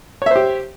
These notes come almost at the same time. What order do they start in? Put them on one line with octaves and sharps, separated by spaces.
C#5 E5 C5 G4